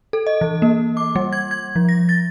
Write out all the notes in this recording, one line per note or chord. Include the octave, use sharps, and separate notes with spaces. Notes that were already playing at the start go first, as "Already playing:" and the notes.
A4
D#5
E3
A#3
D6
G3
G#6
G#6
F3
A#6
A6